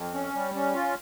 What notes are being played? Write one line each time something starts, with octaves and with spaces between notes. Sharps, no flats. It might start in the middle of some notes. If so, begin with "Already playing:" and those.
Already playing: F2
C#4
G3
C#4
F4